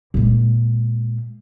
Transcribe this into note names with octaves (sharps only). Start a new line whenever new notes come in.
A#2 G#3